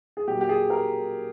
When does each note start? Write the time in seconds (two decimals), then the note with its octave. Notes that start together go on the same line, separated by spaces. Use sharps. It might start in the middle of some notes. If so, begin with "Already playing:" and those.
0.17 G#4
0.27 A#2 F#3 A#3 G4
0.41 G4
0.49 G#4
0.70 A#4